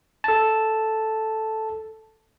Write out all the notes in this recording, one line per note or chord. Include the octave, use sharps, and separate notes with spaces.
A4 A5